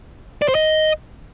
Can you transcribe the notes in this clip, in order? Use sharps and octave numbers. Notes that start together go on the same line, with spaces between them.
D5
C5
D#5